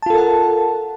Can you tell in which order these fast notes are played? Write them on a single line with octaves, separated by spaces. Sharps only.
A5 F4 A4 A#4 F#5